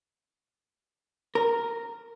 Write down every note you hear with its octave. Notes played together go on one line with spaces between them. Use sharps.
A#4